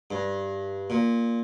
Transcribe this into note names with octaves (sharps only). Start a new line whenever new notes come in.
G2
A#2